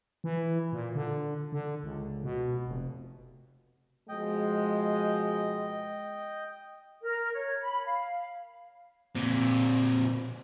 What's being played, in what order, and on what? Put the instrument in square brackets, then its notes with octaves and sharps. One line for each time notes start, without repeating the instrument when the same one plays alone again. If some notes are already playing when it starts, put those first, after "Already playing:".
[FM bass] E3
A#2
D3
D3
C#2
B2
F1
[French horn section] B2 F3 G#3 [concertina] D#5 G5
[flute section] A#4
C#5
B5
F5
[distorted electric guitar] A#2 C4